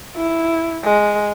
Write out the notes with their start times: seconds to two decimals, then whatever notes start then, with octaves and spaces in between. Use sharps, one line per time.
0.17 E4
0.84 G#3